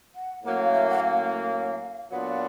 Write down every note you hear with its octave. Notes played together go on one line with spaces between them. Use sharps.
F#5
A2 F#3 A#3 C#4 F#5
F5
E5
F#5
F5
A#2 F#3 B3 D4 F4 F#5